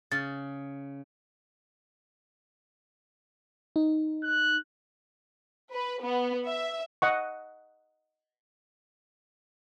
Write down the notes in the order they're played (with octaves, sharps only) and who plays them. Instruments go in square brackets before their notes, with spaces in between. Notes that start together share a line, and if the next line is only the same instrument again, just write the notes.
[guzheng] C#3 [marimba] A6
[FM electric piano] D#4
[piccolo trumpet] F#6
[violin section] B4
B3
E5
[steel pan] D#5 F#5 C#6